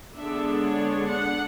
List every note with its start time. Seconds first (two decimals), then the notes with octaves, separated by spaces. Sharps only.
0.16 D3 G#3 B3 D4 E5
0.63 C#5
1.09 F#5